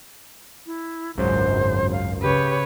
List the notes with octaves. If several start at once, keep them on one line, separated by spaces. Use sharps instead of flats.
E4
G#1 C#2 F#2 C5
F5
C#3 G4 B4 C#5